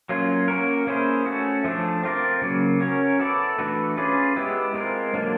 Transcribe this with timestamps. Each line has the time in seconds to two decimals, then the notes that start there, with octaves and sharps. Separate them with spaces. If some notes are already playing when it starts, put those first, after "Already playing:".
0.09 F#3 A#3 C#4 F4
0.48 A#3 C#4 F#4 A#4
0.87 A#3 C#4 E4 G#4 C5
1.26 A3 C#4 F#4
1.64 F3 A3 D4
2.03 C4 F4 A#4 D5
2.42 C#3 F#3 A#3
2.80 C#4 F#4 A#4 C#5
3.19 B3 E4 A4 D5
3.59 E3 A3 D4 F#4 B4
3.97 C#4 F4 G#4 B4 D5
4.36 G#3 B3 E4 G4 B4
4.74 G#3 C4 F4 A#4
5.14 D3 F#3 A#3 D4